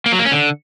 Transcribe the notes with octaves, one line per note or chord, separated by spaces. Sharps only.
A#3
F#3
A#3
C#4
D3